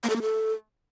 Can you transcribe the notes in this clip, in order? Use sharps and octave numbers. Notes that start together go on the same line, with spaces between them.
A#3
A4
A#3
A4